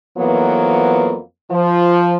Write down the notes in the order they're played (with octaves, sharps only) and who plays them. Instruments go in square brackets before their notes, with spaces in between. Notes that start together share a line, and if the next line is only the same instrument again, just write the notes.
[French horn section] F2 E3 F#3 A#3 B3
F3